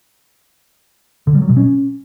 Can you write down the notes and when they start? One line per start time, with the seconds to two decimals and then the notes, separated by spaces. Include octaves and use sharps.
1.27 D3
1.34 G3
1.42 F#3
1.49 B2
1.57 C#4